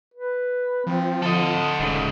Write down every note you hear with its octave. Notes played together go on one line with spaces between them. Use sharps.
B4
F3 C4
D3 A4 D#5
D#1 G#2 C#3